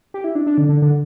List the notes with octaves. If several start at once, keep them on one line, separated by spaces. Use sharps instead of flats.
G4
E4
D4
D4
D3
D3
D3